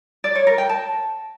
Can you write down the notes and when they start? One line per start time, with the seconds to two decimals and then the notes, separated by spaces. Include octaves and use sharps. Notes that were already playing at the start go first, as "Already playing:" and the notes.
0.24 D5
0.35 C#5
0.47 A#4
0.58 G5
0.69 A5